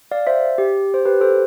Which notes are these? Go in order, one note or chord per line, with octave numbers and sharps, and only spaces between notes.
D5 F5
C5 E5
G4
C5
G4 B4
A4 C5